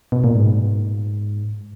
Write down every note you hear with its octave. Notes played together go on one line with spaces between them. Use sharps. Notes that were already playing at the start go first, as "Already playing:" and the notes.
B2
A#2
G#2